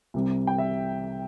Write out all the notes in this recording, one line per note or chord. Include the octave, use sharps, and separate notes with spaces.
C2 C3 G3
G5
E5